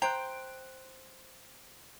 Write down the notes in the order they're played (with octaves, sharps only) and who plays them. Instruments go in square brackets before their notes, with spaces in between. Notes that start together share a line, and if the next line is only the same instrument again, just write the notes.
[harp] C5 F#6 [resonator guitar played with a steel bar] G5 [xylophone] A#5